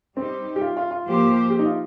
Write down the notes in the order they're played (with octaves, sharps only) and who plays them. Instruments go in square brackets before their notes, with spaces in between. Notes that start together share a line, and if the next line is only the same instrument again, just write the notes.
[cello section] G3 D#4 G4 [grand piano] C4
[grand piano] G4
F4
F4
F4
[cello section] F3 A#3 G4 C5
[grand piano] G4
D#4
F4